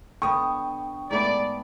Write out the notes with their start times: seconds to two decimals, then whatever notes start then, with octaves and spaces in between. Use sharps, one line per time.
0.22 D3 B3 G5 C#6 D#6
1.11 G#2 A3 B3 D5